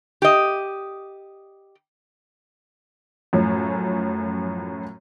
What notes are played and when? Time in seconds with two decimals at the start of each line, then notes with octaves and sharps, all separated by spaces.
0.22 G4 D#5
3.33 F#2 A2 F3 C#4